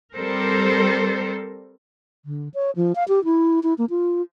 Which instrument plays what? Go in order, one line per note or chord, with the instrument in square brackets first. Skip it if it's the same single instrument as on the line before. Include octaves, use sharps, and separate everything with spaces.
[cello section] G3 C4 A4 A#4 C5
[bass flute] D3
C#5
F3
F5
G4
E4
E4
A#3
F4